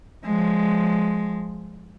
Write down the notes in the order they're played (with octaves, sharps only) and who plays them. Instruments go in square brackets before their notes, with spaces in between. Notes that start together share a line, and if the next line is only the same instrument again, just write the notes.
[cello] F3 G#3